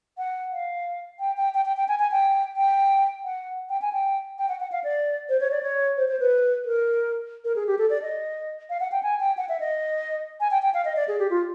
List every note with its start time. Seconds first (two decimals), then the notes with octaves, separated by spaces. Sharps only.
0.18 F#5
0.52 F5
1.20 G5
1.37 G5
1.55 G5
1.65 G5
1.77 G5
1.88 G#5
1.99 G#5
2.11 G5
2.57 G5
3.25 F#5
3.70 G5
3.82 G#5
3.93 G5
4.38 G5
4.49 F#5
4.60 F#5
4.72 F5
4.84 D5
5.29 C5
5.40 C#5
5.51 D5
5.63 C#5
5.97 C5
6.08 C5
6.20 B4
6.65 A#4
7.45 A#4
7.56 G#4
7.67 G4
7.78 A4
7.90 D5
8.02 D#5
8.70 F5
8.80 F#5
8.92 G5
9.03 G#5
9.20 G5
9.37 F#5
9.49 E5
9.60 D#5
10.40 G#5
10.51 G5
10.62 G5
10.74 F5
10.85 D#5
10.96 D5
11.08 G#4
11.19 G4
11.30 F4